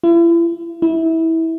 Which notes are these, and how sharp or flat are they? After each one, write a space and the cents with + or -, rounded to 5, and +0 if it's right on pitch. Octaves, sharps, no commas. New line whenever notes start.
E4 +40
E4 -20